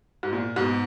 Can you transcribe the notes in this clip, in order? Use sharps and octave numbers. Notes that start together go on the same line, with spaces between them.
G#2
A#2
G#2 B2